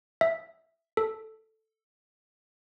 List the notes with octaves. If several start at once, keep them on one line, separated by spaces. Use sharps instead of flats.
E5
A4